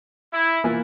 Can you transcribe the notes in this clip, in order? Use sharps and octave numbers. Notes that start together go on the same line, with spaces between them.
E4
E3 A#3 F4